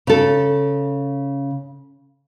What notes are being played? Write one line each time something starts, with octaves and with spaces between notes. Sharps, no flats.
C#3 A4